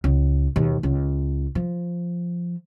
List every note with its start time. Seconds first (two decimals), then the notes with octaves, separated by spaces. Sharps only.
0.04 C#2
0.56 D#2 B2
0.83 C#2
1.55 F3